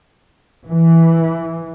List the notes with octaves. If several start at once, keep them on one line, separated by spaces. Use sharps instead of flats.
E3